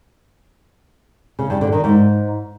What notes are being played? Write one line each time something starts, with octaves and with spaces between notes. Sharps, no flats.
C#3
G2
D3
D#3
G#2